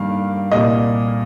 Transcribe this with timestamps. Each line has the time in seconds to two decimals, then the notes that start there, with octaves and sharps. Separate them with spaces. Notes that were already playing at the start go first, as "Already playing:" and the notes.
Already playing: G2 D#3 A#3 F5
0.51 C2 A#2 G3 A#3 D#5